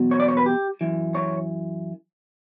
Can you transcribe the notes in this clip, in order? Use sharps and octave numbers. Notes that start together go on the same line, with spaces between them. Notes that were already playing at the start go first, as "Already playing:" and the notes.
Already playing: E2 B2 F#3
C#5
D5
C#5
B4
G4
F#2 E3
C#5